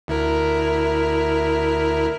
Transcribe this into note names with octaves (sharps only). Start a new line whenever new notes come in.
D2 E4 A#4